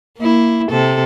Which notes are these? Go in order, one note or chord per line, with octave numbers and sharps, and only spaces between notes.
A#3 E4
C3 A4